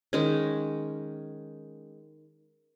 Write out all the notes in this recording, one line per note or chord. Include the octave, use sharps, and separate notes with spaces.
D#3 G#3 C#4